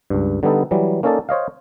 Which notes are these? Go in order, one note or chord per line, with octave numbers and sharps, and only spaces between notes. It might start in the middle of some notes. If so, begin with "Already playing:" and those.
C#2 G2
D3 G3 B3 D#4 A4
E3 F#3 G3
A#3 C#4 D#4 A4 D5 A5
C5 C#5 D#5 F5